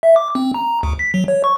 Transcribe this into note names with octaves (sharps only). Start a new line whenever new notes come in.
E5
D6
C4
A#5
D2
B6
F#3
C#5
C#6